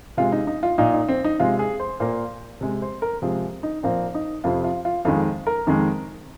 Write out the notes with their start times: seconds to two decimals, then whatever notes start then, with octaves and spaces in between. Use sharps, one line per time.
0.17 C3 G#3 F4
0.32 D#4
0.47 D#4
0.63 F4
0.78 A#2 A#3 D#4
0.93 D#4
1.09 C4
1.24 D#4
1.40 C3 G#3 F4
1.59 G#4
1.80 C5
2.00 A#2 A#3 C5
2.61 C3 G#3
2.82 C5
3.02 A#4
3.22 C3 F3 G#3 G#4
3.63 D#4
3.83 A#2 F3 A#3 C4
4.15 D#4
4.44 F2 C3 F3 F4
4.64 F4
4.85 F4
5.05 F2 D#3 G#3 F4
5.47 A#4
5.67 F2 D#3 G#3